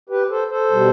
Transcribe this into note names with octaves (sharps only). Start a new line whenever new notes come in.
G4 B4
A4 C5
A4 C5
B2 G3